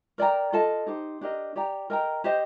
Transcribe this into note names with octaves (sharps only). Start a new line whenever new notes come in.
A#4 D5 G5 A#5
F4 A4 D#5 A5
D#4 G4 C5
D4 G4 A#4 D#5
G4 D5 G5 A#5
A#4 D#5 G5 A#5
G4 C5 D#5